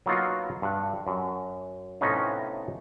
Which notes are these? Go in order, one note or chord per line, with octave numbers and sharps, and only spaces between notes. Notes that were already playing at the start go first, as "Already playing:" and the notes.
F#3 A#3 B3 D#4 F4 F#4
G2 F#5
F#2
A2 C3 B3 C#4 D#4 F4